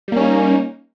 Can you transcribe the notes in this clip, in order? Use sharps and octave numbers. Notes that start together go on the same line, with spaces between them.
G3 A#3 C#4 D#4